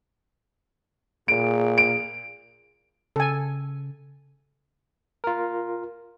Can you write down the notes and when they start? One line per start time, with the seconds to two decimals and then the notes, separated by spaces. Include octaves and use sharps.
1.28 A#2 G#4 D7
1.78 D7
3.16 C#3 A4 G#5
5.24 F4 A#4